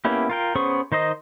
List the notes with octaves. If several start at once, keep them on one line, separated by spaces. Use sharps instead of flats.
A#3 B3 C#4 E4 G4
F4 A#4 G5
B3 C#4 G#4 C5 C#6
D#3 D#4 C5 D#5